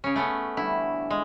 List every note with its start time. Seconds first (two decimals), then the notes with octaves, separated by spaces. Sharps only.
0.04 C#3 C#4
0.16 A3 B3 C#4
0.57 D3 E3 G3 E4
1.10 G#3